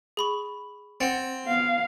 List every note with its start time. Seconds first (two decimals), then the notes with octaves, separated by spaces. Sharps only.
0.17 G#4 B5 C#6
1.01 C4 F#5 A6
1.45 B3 F5